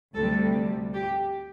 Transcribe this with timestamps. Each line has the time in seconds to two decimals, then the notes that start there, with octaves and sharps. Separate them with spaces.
0.15 D2 C3 G3 A4
0.94 G4